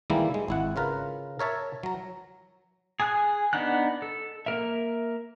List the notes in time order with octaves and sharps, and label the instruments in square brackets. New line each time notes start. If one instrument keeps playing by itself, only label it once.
[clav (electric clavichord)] D#3 E3 G3 G#3 A#3 E4
G#3
G#1 E4 F#5
C#3 F4 A#4 B4
A#4 C#5 E5 A5
F#3 A#5
[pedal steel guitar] G#4 G#5 D#6 F#6
B3 D4 D#4 F#5 F#6
A4
A#3 A#4 E5